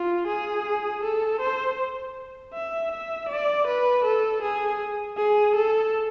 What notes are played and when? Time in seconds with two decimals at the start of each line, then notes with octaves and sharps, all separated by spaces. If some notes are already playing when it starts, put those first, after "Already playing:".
Already playing: F4
0.27 G#4
1.03 A4
1.41 C5
2.54 E5
2.92 E5
3.29 D5
3.67 B4
4.04 A4
4.42 G#4
5.17 G#4
5.55 A4